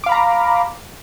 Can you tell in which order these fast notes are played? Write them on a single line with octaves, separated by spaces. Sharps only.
D6 F5 B5 A#5